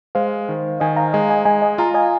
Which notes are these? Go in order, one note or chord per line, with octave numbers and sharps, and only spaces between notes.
G#3 C5 F5
D#3
D#3 D#5 G#5
F5 A#5
G#3 D#5 G#5
D#5 G#5
G#3 D#5 G#5
D#5 G#5
F4 F5 A#5
D#5 G#5